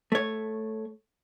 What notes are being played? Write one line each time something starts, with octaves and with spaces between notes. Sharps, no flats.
A3 C#5